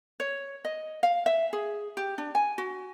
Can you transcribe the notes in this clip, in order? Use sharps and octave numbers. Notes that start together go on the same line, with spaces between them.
C#5
D#5
F5
E5
G#4
G4
D4
G#5
F#4